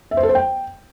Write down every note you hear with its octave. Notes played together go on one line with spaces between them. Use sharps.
E5
C5
A4
C5
G5